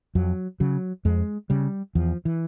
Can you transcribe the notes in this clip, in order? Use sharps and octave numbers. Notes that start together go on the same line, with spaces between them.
F2 F#3
C#3 F#3
F2 G#3
C#3 G3
E2 F3
E3